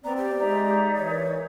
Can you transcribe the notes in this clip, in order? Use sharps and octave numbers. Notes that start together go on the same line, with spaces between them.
B3 C4 D5 A#5
G4 C5
G#3 D#4 D5 E5 A#5
E3 C#5
A#4